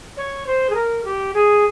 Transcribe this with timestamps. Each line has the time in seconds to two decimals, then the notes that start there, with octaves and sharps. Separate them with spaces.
0.17 C#5
0.46 C5
0.69 G#4
0.74 A#4
1.04 G4
1.33 G#4